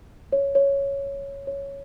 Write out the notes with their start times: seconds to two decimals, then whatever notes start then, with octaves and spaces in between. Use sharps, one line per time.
0.32 C#5
0.55 C#5
1.47 C#5